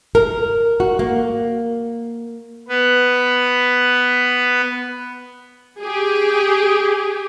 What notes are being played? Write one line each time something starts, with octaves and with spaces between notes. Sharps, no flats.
A#4
F#4
A#3
B3 B4
G4 G#4